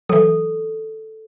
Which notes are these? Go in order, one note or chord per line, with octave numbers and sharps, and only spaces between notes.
E3 F#3 A4